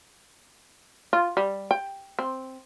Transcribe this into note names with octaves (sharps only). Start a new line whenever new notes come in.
F4
G3
G5
C4